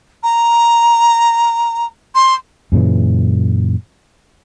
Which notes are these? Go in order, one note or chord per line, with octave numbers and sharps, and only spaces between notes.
A#5
C6
F#2 A#2 C#3 E3